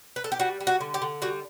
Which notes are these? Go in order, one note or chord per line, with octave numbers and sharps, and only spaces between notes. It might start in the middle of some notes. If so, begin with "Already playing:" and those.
B4
A4
G4
G3 F#4
G3
F#4
D3
G4
D3
G3 F#4